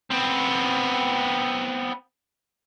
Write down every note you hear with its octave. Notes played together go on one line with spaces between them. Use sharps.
B3 C4